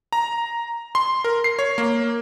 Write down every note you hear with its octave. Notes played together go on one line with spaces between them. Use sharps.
A#5
C6
A#4
C7
C#5
A#3